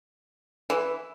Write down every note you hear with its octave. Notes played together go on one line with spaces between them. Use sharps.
E3